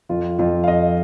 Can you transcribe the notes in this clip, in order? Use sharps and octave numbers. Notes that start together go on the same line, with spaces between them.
F2 F4
F2 F4
F5
F2 D#5